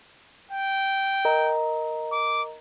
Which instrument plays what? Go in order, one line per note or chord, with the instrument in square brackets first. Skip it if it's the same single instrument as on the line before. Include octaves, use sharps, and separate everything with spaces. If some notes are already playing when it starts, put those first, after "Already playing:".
[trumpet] G5
[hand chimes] A#4 D#5 A#5
[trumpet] D6